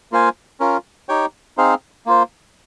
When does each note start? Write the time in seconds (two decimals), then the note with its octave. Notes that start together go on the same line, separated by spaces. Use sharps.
0.12 A#3 F4 C5 F5 G#5
0.60 C#4 F4 A#4
1.09 D#4 G4 C#5 G5
1.57 C4 D#4 G#4 C5 F5
2.06 A#3 F4 C5